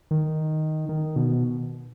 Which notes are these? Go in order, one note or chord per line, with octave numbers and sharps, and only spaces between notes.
D#3
D#3
B2